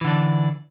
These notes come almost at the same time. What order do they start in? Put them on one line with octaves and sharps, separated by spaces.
E3 D3 D4